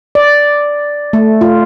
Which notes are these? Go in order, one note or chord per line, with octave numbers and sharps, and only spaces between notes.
D5
A3
F4